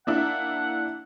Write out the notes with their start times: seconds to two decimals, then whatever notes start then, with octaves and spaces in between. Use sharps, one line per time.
0.07 A#3 D4 E4 F#5